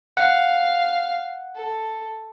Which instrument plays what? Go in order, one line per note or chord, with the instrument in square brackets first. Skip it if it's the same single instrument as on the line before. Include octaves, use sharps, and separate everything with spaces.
[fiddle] F5 [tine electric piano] F#5
[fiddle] A4